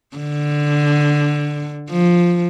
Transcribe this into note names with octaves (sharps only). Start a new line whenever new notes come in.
D3
F3